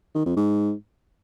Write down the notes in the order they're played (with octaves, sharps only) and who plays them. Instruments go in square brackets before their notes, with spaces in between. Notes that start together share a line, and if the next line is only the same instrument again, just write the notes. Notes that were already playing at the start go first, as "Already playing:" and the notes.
[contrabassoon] D#3
F2
G#2